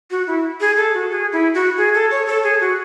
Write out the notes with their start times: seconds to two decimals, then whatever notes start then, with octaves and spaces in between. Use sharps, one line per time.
0.11 F#4
0.27 E4
0.61 G#4
0.76 A4
0.94 F#4
1.11 G#4
1.32 E4
1.54 F#4
1.77 G#4
1.94 A4
2.11 C#5
2.27 A4
2.43 G#4
2.60 F#4